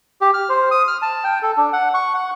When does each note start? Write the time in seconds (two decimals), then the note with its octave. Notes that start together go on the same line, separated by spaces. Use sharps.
0.21 G4
0.34 F6
0.49 C5
0.71 D#6
0.88 F6
1.02 A5
1.24 G5
1.42 A4
1.57 D4
1.73 F#5
1.94 C#6
2.14 F#5